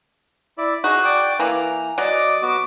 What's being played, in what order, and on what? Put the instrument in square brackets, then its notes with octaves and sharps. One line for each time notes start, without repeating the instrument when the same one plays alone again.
[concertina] E4 D5
[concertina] D#4 G#4 D#5 [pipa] F#4
[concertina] D5 G5 D6
[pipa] E3 A#3 [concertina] A#5
[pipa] F#3 [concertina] D5 D#5 D6
[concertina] B3 F#4 D6